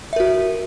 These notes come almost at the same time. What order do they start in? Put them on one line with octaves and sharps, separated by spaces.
E5 A#4 F#4